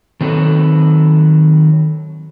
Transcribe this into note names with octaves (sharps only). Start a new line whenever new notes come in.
D#3 F#3 C4 A4 B4